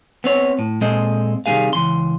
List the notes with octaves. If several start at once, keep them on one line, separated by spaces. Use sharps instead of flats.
B3 C4 C#5
A2
A#2 G#3 C4 A4 D#5
C3 D#3 G3 B3 G#4 F5
C#2 E3 C6